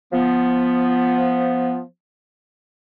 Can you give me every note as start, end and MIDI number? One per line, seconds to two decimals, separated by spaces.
0.12 1.82 53
0.12 1.82 59